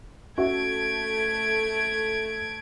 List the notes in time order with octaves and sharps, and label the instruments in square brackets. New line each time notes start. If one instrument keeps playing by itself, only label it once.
[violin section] A3 G#6 D7 [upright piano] C#4 F#4 E5